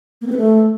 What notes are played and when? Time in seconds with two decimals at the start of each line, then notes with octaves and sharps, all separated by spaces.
0.21 A#3
0.27 C4
0.32 B4
0.37 A3